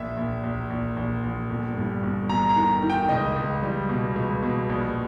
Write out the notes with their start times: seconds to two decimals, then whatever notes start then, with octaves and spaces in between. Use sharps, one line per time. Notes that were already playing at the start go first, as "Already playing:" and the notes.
Already playing: A#1 E5
0.17 A#1
0.44 A#1
0.70 A#1
0.97 A#1
1.23 A#1
1.50 G1
1.77 G2
2.03 G1
2.29 G1 A#5
2.49 A#5
2.56 D#3
2.83 D#3
2.90 G5
3.09 C#2 D#5
3.36 C#2
3.63 G3
3.89 B2
4.16 C#2
4.43 B2
4.69 A#1